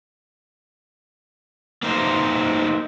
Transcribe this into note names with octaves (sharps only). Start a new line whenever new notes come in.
A#3 B3 D#4 A#4 C5